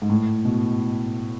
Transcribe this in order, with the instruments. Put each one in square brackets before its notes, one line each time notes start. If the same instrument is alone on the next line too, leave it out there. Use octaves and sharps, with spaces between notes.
[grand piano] G#2
A2
B2